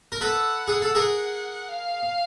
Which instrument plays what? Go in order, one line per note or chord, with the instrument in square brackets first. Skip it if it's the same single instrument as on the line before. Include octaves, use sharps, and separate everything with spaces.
[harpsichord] A#4
[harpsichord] A4 B4 [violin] F#5
[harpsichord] G#4
A4
[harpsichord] G#4 A#4 [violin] F#5
[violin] F5